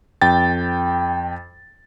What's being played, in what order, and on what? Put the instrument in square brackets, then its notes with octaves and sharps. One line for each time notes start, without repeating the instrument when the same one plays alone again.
[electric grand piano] F2 G5 A6